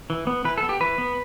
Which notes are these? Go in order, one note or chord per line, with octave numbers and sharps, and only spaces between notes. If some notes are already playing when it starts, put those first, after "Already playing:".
E3
B3
E3 B4
A4
B3
G4
E3 B4
B3